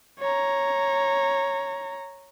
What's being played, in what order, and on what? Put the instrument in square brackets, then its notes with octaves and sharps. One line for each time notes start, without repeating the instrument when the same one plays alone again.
[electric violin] C#5 A#5